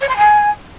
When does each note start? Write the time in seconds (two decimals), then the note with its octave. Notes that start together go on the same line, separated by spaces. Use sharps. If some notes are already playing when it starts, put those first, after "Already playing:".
0.01 C#5
0.09 C6
0.17 G#5